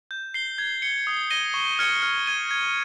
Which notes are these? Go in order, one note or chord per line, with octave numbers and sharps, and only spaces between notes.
G6
C7 G7
G#6
C#7 G7
D#6
A#6 D#7 G7
C#6
F6 G#6 C#7 G7
F6
G#6 D#7 G7
G#6